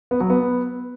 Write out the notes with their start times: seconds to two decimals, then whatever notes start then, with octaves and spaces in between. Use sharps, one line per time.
0.11 B3
0.20 F#3
0.30 B3